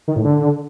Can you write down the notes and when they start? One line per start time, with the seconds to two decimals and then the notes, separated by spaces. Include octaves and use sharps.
0.08 D#3
0.16 A2
0.24 D3